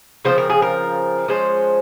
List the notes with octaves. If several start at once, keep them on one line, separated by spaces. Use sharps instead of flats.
C#3 F3 C4 C5
A#4
G#4
A#4
F3 G#3 C#4 C5